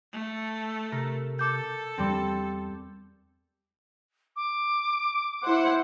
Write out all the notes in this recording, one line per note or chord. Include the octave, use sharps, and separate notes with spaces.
A3 A4
C3 A#4
A4 D6 G6
E2 G3 C4
D6
E4 C5 F#5